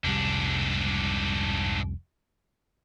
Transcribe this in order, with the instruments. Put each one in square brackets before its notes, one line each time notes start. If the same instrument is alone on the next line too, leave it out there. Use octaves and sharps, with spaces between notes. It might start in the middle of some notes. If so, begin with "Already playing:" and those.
[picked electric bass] F1 C2 G3 [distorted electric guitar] G#2 D4